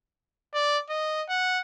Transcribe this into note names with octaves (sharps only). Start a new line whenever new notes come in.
D5
D#5
F#5